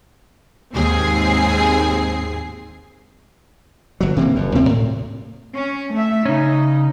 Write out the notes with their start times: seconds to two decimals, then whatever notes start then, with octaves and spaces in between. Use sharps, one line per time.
0.73 D#2 G#2 C4 G#4 C7
4.01 G1 F#3
4.17 C3 E3 A#3
4.35 F#1 F#2
4.55 D#2 C3 C4
4.69 A2
5.56 C#4
5.92 A3 E5
6.26 C#3 C#4 D#4